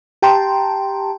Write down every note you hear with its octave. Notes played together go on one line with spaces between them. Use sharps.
G4 G5 A5 A#5 C6